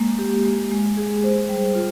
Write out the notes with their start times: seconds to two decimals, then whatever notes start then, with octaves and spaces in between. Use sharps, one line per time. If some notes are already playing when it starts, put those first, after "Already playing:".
Already playing: G#3 A#3
0.19 G4
0.45 G#3
0.71 G#3
0.97 G#4
1.24 C5
1.49 G3
1.75 F4